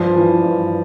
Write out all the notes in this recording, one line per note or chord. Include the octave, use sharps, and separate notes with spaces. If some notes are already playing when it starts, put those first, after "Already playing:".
Already playing: G2 F3
E3
G2